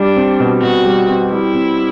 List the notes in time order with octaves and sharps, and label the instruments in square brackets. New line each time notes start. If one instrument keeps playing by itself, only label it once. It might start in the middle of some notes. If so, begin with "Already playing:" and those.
Already playing: [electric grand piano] G3 [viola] D4
[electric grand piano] C4
B2
[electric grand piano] B2 [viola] F#4
[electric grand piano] G3
C4
[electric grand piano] G3 [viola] E4
[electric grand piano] C4